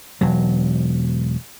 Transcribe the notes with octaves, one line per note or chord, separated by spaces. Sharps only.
E1 F#3